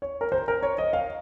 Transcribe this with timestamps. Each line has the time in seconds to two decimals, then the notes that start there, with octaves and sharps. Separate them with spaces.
0.02 C#5
0.21 A#4
0.32 C5
0.48 A#4
0.63 C#5
0.78 D#5
0.93 F5